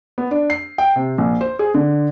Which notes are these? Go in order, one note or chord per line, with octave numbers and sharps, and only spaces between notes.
B3
D4
C7
G5
C3
A#1
C5
G#4
D3